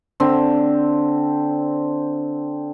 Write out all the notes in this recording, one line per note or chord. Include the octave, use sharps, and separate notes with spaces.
D3 C4